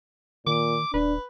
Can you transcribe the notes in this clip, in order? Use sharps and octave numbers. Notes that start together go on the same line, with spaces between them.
A#2 D#3 D6
D#1 D4 B4